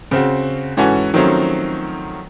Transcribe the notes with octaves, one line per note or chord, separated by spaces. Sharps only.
C#3 C4 F#4
G#2 E3 C#4 F#4 A4 G#5
D#3 F3 F#3 A3 C4 C#4